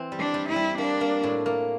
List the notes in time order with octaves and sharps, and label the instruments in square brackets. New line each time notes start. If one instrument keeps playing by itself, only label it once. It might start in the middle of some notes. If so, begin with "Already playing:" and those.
Already playing: [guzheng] E3 C4
G3
[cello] D4
[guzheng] G3
[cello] E4
[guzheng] G3
[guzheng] A#3 [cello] D4
[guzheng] A#3
A2
A#3